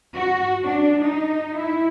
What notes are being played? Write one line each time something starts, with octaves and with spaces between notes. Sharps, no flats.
F#4
D4
D#4
E4